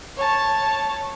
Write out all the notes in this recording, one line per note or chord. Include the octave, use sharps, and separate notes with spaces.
C#5 A5